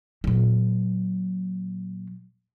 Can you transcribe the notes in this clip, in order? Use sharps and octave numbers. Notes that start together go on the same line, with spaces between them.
A#2 F#3